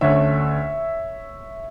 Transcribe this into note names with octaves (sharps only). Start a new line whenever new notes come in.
D2 D3 A3 C#4 C#5 E5